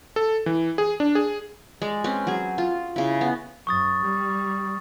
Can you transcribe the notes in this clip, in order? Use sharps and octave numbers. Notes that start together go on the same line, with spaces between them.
A4
E3
G#4
D4
G#4
G#3 D5
C4 C#4 B4
F#3 G#4
F4
C#3 E4
B3
F#2 C#6 D#6 A6
G3